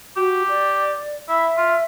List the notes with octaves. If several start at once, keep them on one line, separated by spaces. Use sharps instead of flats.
F#4 G4
D5
E4 E5
F4